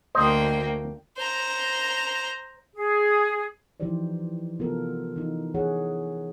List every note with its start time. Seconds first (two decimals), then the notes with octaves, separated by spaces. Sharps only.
0.15 D2 A#3 C5 D#5 G5
1.17 C5 A#5
2.75 G#4
3.80 E3 F3 D#4 G4 C5 D5
4.59 C3 B3 F4 G4 A4 A#4
5.16 E3 D#4
5.54 E3 G#4 C#5 F#5